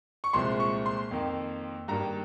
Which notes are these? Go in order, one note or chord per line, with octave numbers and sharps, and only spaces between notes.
C#6
C2 A#2 F3 G#3 C6
C#6
C6
F2 D#3 A#3
G2 D#3 G3 A#3 A#5